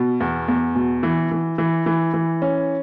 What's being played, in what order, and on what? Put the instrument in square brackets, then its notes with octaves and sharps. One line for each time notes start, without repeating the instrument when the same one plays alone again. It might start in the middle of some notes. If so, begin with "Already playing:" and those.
Already playing: [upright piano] B2
E2
E2
B2
E3
E3
E3
E3
E3
C#4